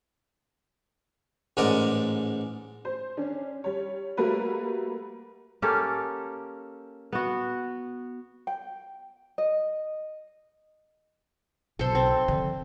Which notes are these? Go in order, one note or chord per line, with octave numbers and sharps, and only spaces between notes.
A1 G#2 G#3 A#4 D5 F#5
C5
C#4 D4
G3 C#5
G3 A3 A#3 F#4 B4
A#3 C#4 G4 A4
B3 F#4
G5
D#5
B1 A4 C5
C4
D3 F3